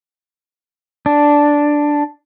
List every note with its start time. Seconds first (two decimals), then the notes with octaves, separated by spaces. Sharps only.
1.06 D4